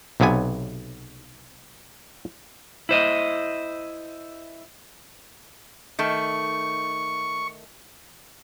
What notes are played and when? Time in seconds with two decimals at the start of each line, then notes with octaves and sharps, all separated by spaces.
0.20 B1 C3 F#3 B3 G#5
2.89 E4 C5 D#5
5.99 D#3 A3 C#6